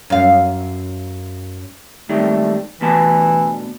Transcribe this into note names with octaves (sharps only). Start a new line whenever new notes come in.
F#2 F5
G#2 D#3 G3 A3
D2 B2 E3 A5